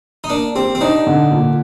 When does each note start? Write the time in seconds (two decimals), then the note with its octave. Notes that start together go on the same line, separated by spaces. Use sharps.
0.24 D#4
0.30 A#3 D4
0.55 C4 G4
0.75 C4
0.81 D4 D#4
1.07 D3
1.31 A#2